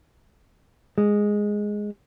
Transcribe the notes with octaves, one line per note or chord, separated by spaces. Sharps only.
G#3